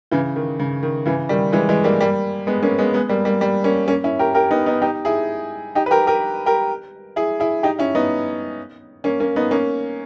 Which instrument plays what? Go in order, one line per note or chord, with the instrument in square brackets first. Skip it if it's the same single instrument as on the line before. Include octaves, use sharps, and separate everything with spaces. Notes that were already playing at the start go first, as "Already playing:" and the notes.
[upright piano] C#3 E3
D#3
C#3
D#3
C#3 E3
D#3 G3
E3 G#3
E3 G#3
G3 A#3
G3 A#3
G#3 B3
A#3 C#4
G#3 B3
G#3 B3
G3 A#3
G3 A#3
G3 A#3
A#3 C#4
A#3 C#4
C#4 E4
G4 A#4
G4 A#4
B3 D#4
B3 D#4
D#4 G4
E4 G#4
D#4 G4
B4
G4 A#4
G4 A#4
G4 A#4
E4 G#4
E4 G#4
D#4 G4
C#4 E4
B3 D#4
A#3 C#4
A#3 C#4
B3 D#4
A#3 C#4